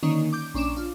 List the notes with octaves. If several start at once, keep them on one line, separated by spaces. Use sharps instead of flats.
D3 D#3 A#3 C#4 D#4
D6 G6
A#1 C#4 D4 D6 E7
D4 F4